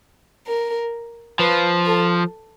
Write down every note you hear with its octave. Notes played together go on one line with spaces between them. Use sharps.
A#4
F3 B4
A4